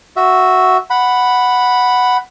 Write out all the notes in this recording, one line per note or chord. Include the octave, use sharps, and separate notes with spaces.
F#4 E5
F#5 B5